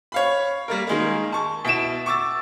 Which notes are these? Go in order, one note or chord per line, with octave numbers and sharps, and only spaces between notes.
C#5 F5 B5
G3 A#3 A#4
D#3 G#3 A#3
A5 C#6
B2 E4 D7 E7
C#6 D6 E6 A6